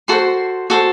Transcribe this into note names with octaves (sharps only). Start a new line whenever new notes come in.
F#4 A4 C5 C6
F#4 A4 C5